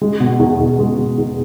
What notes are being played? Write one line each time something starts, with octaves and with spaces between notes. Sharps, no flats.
G#3
B2
E2
E2
G#3
B2
E2